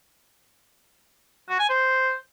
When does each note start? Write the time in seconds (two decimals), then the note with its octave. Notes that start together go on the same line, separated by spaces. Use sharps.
1.49 F#4
1.59 G#5
1.70 C5